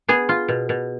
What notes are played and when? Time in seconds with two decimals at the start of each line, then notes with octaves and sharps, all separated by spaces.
0.08 B3 G#4
0.29 F4
0.48 B2
0.69 B2